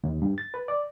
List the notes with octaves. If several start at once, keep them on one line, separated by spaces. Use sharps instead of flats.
D#2
G2
A6
B4
D5